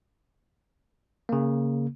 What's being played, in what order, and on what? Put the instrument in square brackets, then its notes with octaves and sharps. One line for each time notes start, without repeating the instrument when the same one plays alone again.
[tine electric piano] C#3 A#3